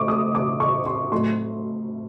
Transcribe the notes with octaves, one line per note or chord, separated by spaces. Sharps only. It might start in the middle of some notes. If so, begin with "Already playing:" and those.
Already playing: A2 A3 C#6 D6
D#6
D6
C#6
C6
A2 F#3 A3 C6